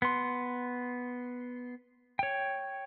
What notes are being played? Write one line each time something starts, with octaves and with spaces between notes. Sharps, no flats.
B3 C6
C#5 G5